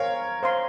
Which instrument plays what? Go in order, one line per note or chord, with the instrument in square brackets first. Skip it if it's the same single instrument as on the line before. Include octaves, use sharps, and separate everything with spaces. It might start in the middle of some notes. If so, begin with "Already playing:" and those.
Already playing: [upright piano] A#4 C#5 [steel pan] C5 F5 G#5
[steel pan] C5 F5 C6